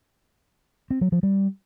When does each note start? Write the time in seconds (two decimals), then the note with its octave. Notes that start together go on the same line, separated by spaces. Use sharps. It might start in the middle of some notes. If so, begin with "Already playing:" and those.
0.90 C4
1.01 F#3
1.12 F3
1.23 G3